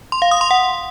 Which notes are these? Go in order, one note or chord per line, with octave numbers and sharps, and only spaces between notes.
C6
F5
D#6
C6
F#5